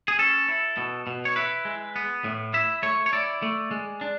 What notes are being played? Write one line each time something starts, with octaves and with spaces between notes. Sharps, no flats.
G#4
C#4 A4
E4
B2
B2
C#5
E4 B4
G#3
B3
A2
E4 E5
A3 C#5
C#5
E4 D5
A3
G#3
D4